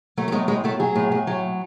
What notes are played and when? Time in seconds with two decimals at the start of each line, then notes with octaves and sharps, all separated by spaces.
0.17 F#3 A3
0.28 A3
0.32 A2 G#3
0.48 A2 G#3
0.64 F#3 A3
0.80 F#3 G#4
0.95 A2
1.12 A2
1.27 F#3